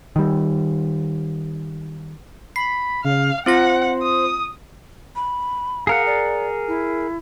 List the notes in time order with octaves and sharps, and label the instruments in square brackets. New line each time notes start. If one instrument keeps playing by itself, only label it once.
[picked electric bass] D#3 G3
[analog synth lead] B5 [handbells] C7
[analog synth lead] C#3 [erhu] F5
[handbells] C4 F4 A#6 [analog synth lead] C5 [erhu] F#5
[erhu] D#6
[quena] B5
[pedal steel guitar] G#4 A#4 F#5 [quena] F5
[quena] D5
E4